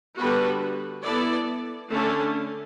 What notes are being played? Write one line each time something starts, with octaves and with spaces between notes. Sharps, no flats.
D3 G3 B3 F#4 B4
B3 E4 A4 D5
D3 A3 C#4